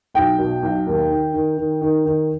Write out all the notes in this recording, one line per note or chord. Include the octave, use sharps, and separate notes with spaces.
B1 G5
B2
B1
D#2
D#3
D#3
D#3
D#3
D#3